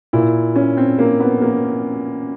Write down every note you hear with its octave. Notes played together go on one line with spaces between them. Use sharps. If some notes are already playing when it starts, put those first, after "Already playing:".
A#2 E4
C#4
C4
A#3
B3
A#3